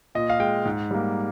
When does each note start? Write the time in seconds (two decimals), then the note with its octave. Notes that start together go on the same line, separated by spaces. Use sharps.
0.15 A#2 D#5
0.30 F5
0.40 G#3 G5
0.65 G#2
0.91 G3 A#3